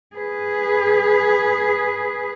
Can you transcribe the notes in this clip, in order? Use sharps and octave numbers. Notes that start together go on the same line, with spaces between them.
G#4 B4